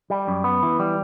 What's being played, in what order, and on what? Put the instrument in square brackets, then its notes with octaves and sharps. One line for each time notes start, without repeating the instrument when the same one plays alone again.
[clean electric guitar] G3
F#2
B3
E3
G3